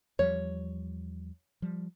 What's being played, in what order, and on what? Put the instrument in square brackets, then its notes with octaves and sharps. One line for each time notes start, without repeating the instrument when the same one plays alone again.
[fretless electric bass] E2 F3 G3 [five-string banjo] C#5
[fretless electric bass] F3 G3